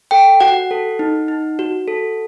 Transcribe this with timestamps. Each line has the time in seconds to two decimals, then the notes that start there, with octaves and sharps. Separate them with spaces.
0.11 A4 G5
0.40 F#4 F#5
0.71 A4
0.99 D#4
1.28 D#4
1.59 F#4
1.88 A4